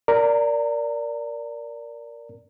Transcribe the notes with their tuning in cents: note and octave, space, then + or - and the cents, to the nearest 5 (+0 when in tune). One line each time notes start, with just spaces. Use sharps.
A#4 +0 D5 -10 A#5 -30